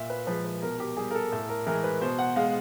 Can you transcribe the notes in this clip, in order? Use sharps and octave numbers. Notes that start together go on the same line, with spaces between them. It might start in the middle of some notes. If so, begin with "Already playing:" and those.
Already playing: A#2 E5
B4
F3 G#3 B4
B4
B2 A#4
G4
G3 G#4
A#4
A4
A2 A4
A#4
E3 G#3 A#4
B4
B2 C5
F#5
G#3 F5